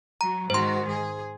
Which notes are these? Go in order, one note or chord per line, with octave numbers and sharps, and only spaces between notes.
F#3 A#5
G#2 D#3 F#4 C5 C6
G#4